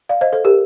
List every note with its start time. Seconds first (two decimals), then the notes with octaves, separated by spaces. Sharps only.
0.09 D5 F5
0.21 C5 D#5
0.33 A4 C5
0.44 G4 A#4